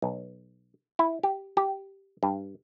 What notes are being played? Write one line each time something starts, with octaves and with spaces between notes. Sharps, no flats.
B1
E4
G4
G4
G2